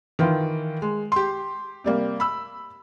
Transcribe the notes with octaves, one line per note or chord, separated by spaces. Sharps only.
D#3 E3 F4
G#3
G4 C6
C3 G3 A#3
B5 E6